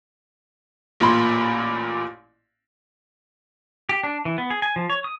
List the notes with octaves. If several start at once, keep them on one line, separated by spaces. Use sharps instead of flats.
A1 A#2 A#3 B5 C6
G4
D4
E3
B3
G#4
G#5
F3
C#5
D#6